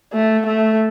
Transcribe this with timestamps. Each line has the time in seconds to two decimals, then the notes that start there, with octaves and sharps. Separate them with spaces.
0.14 A3
0.47 A3